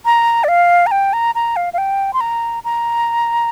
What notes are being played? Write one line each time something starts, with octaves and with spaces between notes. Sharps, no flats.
A#5
D5
F5
A#5
G5
A#5
A#5
F5
F5
G5
C6
A#5
A#5